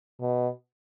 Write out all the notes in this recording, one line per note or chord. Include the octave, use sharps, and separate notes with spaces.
B2